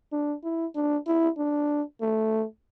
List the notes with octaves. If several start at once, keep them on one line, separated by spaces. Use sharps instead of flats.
D4
E4
D4
E4
D4
A3